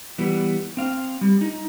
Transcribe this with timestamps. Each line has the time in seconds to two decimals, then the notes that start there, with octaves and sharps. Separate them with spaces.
0.18 E3 G3 B3
0.77 C4 F5
1.21 G3
1.41 D#4